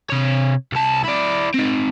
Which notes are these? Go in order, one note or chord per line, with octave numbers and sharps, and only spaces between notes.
C3 C#5
C2 A5
E4 D5
C4 D#4